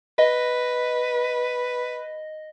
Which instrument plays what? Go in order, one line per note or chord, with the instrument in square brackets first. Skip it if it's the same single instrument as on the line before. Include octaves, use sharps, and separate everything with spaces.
[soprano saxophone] B4 [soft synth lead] D#5